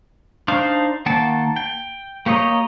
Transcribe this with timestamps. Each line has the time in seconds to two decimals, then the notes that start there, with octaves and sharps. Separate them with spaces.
0.48 D4 D#4 C5 F5
1.06 D#3 A#3 F#5 G5 A5
1.56 G5
2.26 A#3 G4 C#5 D#5 A#5